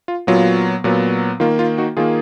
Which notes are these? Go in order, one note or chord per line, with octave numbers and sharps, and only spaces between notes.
F4
A#2 F#3 B3 F4
A#2 F#3 B3
D#3 A#3 F4
F4
D#4 F#4
D#3 A#3 F4 G#4